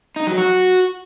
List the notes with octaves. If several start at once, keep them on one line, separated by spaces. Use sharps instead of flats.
D#4
F#3
F#4